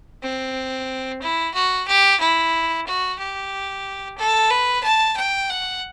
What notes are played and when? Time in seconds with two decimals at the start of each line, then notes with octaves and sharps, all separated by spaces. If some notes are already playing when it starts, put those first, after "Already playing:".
0.23 C4
1.22 E4
1.54 F#4
1.88 G4
2.20 E4
2.87 F#4
3.19 G4
4.18 A4
4.50 B4
4.83 A5
5.17 G5
5.50 F#5